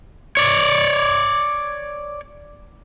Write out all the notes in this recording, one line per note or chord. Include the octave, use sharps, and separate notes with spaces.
C#5 D5